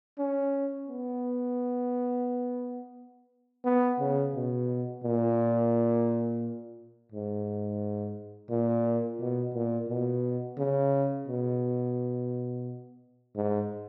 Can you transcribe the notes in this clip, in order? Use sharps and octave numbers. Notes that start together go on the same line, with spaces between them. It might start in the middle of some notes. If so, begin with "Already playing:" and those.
C#4
B3
B3
C#3
B2
A#2
G#2
A#2
B2
A#2
B2
C#3
B2
G#2